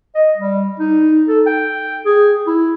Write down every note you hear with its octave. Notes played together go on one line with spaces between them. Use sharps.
D#5
G3
D#4
A4
G5
G#4
E4